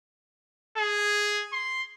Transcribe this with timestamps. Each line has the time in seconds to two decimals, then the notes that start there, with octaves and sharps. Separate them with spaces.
0.78 G#4
1.53 C6